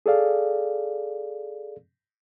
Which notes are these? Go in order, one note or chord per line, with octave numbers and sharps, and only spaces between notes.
G#4 A4 D5 F5